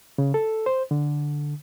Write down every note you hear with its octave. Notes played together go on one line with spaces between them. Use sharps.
C#3
A4
C5
D3